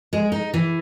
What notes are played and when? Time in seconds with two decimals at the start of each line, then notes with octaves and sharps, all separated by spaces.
0.13 G#3
0.32 D#4
0.54 E3